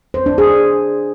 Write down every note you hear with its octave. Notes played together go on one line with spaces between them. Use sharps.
C5
D4
G#4